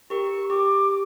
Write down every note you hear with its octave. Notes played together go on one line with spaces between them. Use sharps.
G4 A#4 C#6
G4 D6